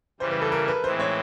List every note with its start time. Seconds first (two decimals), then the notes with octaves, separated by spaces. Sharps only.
0.20 C#3 E3 G3 C5
0.31 B4
0.41 A4
0.52 A#4
0.68 B4
0.84 A2 E3 G#3 C4 C5
1.00 C#5